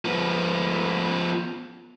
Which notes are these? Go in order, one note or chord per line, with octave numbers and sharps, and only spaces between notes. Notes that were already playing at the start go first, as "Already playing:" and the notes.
F3 B3